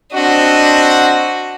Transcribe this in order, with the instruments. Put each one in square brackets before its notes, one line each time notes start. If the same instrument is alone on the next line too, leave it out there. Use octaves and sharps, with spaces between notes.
[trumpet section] C4 F#4 [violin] D4 D#5